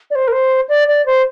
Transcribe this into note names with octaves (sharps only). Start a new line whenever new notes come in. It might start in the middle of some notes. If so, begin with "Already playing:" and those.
D5
C5
A#4
C5
D5
D5
C5